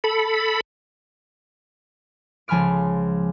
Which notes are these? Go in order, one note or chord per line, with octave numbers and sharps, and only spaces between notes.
A4 B5
C#2 F3 G#5 B5 F6 D7